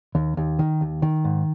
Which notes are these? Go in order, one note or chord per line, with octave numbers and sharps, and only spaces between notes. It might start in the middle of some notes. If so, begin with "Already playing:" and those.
D#2
D#2
D#3
D#2
D#3
G#2